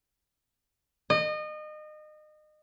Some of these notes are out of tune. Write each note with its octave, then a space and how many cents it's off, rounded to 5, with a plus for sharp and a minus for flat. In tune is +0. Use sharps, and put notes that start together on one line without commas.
D#5 -30